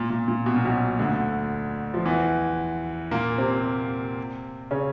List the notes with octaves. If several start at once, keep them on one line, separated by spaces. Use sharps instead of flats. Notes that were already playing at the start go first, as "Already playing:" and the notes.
Already playing: A#2
A#2
A#2
B2
A#2
B1 B2
D2 D3
F3
E2 E3
A#2 A#3
C3 C4
C#3 C#4